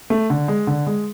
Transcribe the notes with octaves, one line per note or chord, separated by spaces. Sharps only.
A3
D3
G#3
D3
G#3